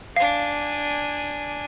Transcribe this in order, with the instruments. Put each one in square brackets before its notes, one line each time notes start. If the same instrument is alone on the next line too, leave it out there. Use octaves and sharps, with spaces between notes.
[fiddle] D4 G#5 [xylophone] F5